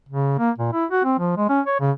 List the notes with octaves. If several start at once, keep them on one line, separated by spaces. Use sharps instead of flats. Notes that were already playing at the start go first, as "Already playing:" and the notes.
C#3
A#3
A#2
E4
F#4
C4
F3
G#3
C#4
C#5
C#3